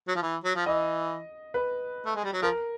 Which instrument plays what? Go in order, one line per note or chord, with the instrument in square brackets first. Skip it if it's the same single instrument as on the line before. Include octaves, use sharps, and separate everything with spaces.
[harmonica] F#3
F3
E3
F#3
F3
[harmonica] E3 [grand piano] D#5
[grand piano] B4
[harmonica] A3
G#3
G3
F#3
[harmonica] F3 [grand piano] A#4